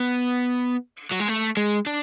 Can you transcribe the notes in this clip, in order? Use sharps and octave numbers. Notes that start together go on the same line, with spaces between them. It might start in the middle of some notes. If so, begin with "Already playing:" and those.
Already playing: B3
F#3
G#3
A3
G#3
D4